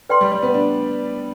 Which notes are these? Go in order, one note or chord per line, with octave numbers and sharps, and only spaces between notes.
B4 D5 G5 C6
G3
G3
B3
D4